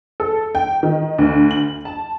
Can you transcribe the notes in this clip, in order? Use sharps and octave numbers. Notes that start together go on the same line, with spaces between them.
A4
G5
D#3
D2
F#7
A5